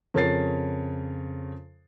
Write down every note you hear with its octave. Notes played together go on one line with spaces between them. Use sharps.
F2 C#3 A#4 C#5 A6 C7